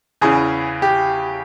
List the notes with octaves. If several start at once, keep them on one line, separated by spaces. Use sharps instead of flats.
E2 C#3 E3 G#4
G4